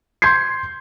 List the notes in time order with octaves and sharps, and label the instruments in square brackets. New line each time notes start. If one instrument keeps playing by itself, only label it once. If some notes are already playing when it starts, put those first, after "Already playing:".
[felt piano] C6 G6 G#6 C7